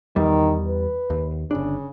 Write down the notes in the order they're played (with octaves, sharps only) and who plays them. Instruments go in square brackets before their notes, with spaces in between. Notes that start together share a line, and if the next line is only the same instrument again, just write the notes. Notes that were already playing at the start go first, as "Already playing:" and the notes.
[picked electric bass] E2 G3 [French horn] D#3
[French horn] B4
[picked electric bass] D#2
[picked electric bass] G1 D4 [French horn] C#3